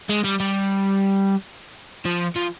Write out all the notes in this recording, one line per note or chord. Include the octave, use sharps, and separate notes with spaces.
G#3
G3
G3
F3
F3